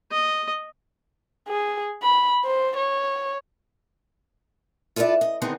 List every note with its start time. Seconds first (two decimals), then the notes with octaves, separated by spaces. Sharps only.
0.11 D#5
1.49 G#4
2.02 B5
2.44 C5
2.77 C#5
4.96 F4 A4 B4 C5 D5 E5
5.21 D#5
5.42 D3 D#3 B3 C4 D#4 G#4